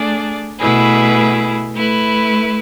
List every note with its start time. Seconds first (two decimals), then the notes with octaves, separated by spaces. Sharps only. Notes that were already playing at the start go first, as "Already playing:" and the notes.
Already playing: A3 D4 G#4 D5
0.58 B2 A3 E4 G#4 B4
1.74 A3 E4 B4